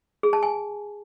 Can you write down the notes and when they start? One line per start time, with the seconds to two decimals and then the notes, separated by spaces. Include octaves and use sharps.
0.23 G#4
0.33 A5
0.43 G#5